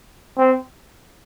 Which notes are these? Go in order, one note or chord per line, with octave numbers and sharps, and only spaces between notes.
C4